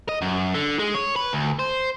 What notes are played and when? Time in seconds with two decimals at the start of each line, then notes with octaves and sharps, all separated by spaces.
0.09 D#5
0.22 F#2
0.54 D3
0.79 G#3
0.94 C#5
1.16 B4
1.33 D2
1.59 C5